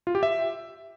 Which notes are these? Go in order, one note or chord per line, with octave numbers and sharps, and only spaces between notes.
F4
G4
E5